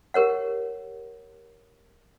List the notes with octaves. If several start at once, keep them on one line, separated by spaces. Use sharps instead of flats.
G4 A#4 C#5 F#5